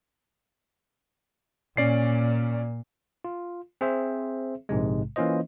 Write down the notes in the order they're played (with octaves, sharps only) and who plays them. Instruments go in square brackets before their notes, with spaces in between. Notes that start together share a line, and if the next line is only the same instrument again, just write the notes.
[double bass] A#2 [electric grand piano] C#4 D5 C7
[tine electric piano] F4
C4 G#4 C5 E5
A#1 G#2 C3 G#3
E3 A#3 C#4 F4 C5 D#5